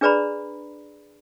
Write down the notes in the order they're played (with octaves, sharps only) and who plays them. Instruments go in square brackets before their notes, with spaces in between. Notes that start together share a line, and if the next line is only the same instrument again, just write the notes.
[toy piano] D4 G#4 B4 D5 A#5 B5